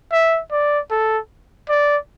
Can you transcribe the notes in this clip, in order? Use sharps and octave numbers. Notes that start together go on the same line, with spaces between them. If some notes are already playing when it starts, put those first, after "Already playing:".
E5
D5
A4
D5